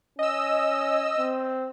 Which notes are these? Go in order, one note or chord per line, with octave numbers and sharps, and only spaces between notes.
C#4 D#5 E6
C4